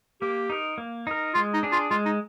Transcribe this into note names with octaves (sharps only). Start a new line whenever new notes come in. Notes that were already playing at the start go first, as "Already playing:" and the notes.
A#3 G4
D#4 A#4
A#3
D#4 A#4
G#3 F4
D#4
D4 G#4
F4
G#3 F4
D#4